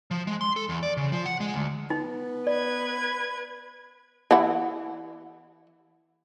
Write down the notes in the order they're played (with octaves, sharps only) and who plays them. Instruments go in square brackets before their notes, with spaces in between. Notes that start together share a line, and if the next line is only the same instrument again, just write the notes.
[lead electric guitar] F3
G#3
C6
A4
E2
D5
C#3
F3
F#5
G#3
D2
[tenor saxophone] B3 [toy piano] D#4
[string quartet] B4 G#6 [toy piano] D5
[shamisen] E3 E4 F#5